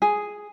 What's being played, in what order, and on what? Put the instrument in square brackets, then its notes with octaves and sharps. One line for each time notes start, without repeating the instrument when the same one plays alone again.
[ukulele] G#4